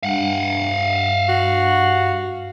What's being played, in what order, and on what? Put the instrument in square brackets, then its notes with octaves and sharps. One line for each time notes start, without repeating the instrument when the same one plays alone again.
[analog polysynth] G2 [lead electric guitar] F5 F#5
[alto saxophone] F#4